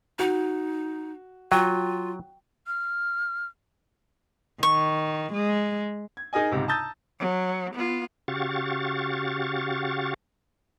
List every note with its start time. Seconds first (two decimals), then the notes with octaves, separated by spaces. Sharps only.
0.19 D#4 F#4
1.52 F#3 F4 G5
2.67 F6
4.63 D#3 C#6
5.33 G#3
6.17 G#6
6.33 D#4 G#4 A#4 D#5 G#5
6.51 C#2 G#2 C3
6.68 A5 A#5 D#6 E6 G6 A6
7.20 F#3
7.74 B3 F4
8.28 C#3 F#4 G4 F5 C#6 A6